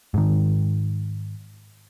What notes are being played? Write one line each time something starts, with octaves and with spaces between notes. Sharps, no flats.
G#2 D#3